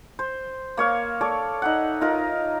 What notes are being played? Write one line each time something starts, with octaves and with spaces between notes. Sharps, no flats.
C5
A#3 C#5 F5
A4 C#5 D5
D#4 E5 F#5
D#4 F4 A#4